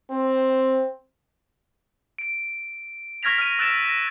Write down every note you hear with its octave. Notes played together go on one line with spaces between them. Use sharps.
C4
D7
C#6 F6 G#6 A#6 B6 F7
F6 D#7
E6 F#6 A6 D7 E7
A#6